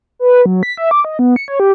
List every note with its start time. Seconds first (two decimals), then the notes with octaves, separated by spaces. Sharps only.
0.19 B4
0.46 F#3
0.63 B6
0.77 E5
0.91 D6
1.05 D#5
1.19 B3
1.36 C#7
1.48 C#5
1.60 G4